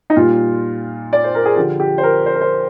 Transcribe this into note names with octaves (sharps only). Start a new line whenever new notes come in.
D#4
A#2 G3 F4
D5
C5
A#4
G#4
D3 F3 G4
G4
C5
A#4
C5
A#4
C5